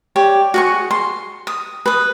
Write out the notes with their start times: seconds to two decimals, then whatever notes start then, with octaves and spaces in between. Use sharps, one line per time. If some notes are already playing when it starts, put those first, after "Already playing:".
0.16 G4 C#5 D5
0.54 F#4 G#4 C#6
0.91 C6
1.47 D#6
1.86 B4 D#6